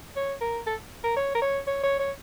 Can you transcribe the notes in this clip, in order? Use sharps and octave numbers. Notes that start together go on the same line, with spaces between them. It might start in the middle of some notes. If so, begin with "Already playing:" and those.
C#5
A#4
A4
A#4
C#5
A#4
C#5
C#5
C#5
C#5